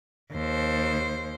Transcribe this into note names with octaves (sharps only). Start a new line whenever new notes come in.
D#2 C5